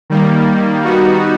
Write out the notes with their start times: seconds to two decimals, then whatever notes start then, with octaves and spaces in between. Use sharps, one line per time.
0.10 D#3 G3 A#3
0.85 G3 B3 D#4 F#4